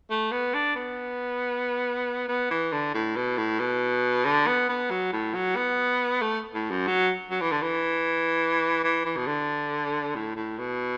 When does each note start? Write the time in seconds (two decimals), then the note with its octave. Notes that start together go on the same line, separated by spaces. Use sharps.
0.10 A3
0.32 B3
0.54 D4
0.76 B3
2.28 B3
2.50 E3
2.72 D3
2.94 A2
3.16 B2
3.38 A2
3.59 B2
4.25 D3
4.47 B3
4.69 B3
4.90 F#3
5.12 A2
5.34 F#3
5.56 B3
6.22 A3
6.54 A2
6.70 F#2
6.87 F#3
7.31 F#3
7.41 E3
7.51 D3
7.62 E3
8.84 E3
9.05 E3
9.17 B2
9.27 D3
10.15 A2
10.36 A2
10.58 B2